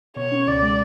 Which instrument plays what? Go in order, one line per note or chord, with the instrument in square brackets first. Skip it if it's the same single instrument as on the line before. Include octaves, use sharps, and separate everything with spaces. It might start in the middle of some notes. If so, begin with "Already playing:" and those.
[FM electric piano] B2 [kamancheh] C#5
[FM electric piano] C#4
[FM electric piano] C#2 [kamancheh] D5
[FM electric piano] G#3